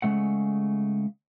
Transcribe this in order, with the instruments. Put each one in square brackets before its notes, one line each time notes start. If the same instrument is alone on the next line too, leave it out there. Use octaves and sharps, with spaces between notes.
[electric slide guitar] C#3 G#3 A3 F#5